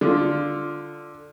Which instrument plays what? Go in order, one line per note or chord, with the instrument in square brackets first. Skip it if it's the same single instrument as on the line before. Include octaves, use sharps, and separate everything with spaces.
[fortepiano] D3 F4